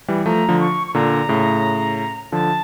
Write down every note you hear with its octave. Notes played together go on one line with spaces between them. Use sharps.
E3 G3
F3 A3 A#5
D3 F3
C#6
C#6
A#2 D3 A#5
A2 C#3
D3 F3 A5